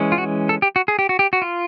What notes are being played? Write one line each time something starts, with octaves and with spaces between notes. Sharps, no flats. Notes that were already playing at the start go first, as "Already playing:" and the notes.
Already playing: E3 G#3 C#4
F4
F#4
A4
G4
F#4
G#4
G4
F#4
G4
F#4
F4